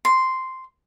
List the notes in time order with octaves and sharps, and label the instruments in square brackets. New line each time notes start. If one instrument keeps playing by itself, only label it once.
[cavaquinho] C6